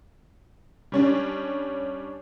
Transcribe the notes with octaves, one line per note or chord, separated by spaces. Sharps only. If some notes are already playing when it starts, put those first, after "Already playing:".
G3 C#4 D4